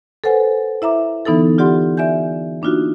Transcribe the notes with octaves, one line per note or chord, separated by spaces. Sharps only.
A4 B4 C5 F#5 G#5
E4 E5 A#5 D6
D3 E3 B3 D#4 E4 A4
F4 G4 D5 F#5 C6
D5 E5 G#5 G6
A#3 D4 D#4 F4 F#4